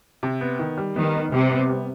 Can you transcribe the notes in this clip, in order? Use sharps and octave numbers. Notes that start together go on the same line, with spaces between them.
C3
B3
D#3
G3
D#3 B3
B3
C3 G3
B3
G3